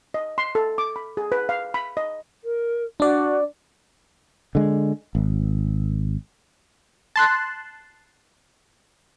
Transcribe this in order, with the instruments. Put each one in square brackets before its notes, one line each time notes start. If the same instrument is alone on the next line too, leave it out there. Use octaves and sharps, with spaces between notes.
[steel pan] D#5
C6
A4
D6
B5
G#4
B4
F5
B5
D#5
[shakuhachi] A#4
[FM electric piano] D4 D5 [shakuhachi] F#4
[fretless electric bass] D3 G#3
G#1
[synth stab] A5 C6 F#6